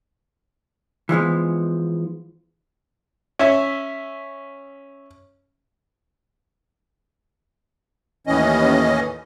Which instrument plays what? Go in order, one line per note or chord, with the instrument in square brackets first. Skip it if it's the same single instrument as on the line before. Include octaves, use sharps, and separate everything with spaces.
[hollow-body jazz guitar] E3 F3 G#3 B3
[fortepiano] C#4 E5
[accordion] D#2 A2 E3 C#4 D#5